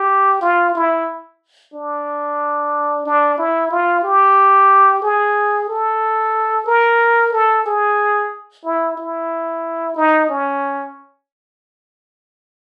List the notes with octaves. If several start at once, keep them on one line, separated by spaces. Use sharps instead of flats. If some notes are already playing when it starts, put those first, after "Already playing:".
Already playing: G4
F4
E4
D4
D4
E4
F4
G4
G#4
A4
A#4
A4
G#4
E4
E4
D#4
C#4